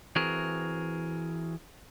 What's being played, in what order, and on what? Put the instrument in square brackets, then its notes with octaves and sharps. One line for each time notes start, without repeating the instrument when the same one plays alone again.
[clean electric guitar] E3 C4 F#4 G#4 A#4